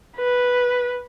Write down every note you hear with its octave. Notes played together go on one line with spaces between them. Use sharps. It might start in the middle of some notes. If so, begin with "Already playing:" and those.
B4